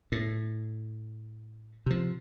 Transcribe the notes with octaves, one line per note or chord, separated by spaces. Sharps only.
A2
C3 F3